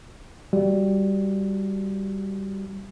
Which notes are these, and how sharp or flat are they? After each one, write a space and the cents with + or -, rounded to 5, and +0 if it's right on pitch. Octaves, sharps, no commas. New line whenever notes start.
G3 +0 F#4 +0